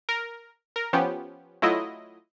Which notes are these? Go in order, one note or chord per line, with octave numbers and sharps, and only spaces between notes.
A#4
A#4
F3 B3 C#4 G4
F#3 A3 E4 F4 D#5